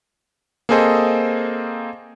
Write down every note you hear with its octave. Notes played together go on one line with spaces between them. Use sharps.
A#3 C4 G#4 A4 C5 D#5